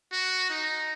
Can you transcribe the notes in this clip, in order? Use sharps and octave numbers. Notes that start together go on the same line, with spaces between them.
F#4
D#4